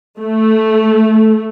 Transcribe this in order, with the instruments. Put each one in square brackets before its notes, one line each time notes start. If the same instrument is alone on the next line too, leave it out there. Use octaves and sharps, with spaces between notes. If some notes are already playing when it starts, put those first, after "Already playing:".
[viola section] A3